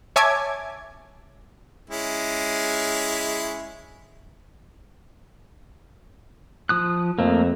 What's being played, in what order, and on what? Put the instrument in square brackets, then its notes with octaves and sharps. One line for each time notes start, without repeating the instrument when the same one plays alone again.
[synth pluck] C#5 E5 G#5 A5 D6 G#6
[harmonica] G#3 C#4 E4
[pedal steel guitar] F3 D#6 F#6
[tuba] F2 [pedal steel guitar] A3 A#3